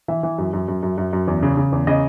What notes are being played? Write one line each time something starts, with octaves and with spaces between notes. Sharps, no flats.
E3 E5
E3
F#2
F#2
F#2
F#2
F#2
F#2
E2
C#3
C#3
E2
C#3 D#5